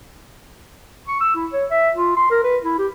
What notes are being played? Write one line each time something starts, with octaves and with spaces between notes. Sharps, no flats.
C#6
E6
E4
C#5
E5
F4
C6
A#4
B4
E4
G4